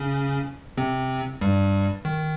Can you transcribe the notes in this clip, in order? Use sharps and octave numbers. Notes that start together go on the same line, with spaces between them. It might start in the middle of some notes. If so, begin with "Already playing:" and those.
Already playing: C#3 C#4
C3 C4
G2 G3
D#3